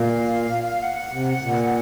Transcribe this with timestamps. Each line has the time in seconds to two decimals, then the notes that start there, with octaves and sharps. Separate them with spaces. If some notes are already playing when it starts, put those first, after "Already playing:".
Already playing: A#2 F5
0.82 F#5
1.12 C3
1.41 A#2